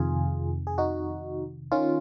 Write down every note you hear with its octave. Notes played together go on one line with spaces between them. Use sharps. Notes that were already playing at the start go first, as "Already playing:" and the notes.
Already playing: F2 C3 D#3 F4 G#4
G#4
D#4 F#4
D#3 C#4 F4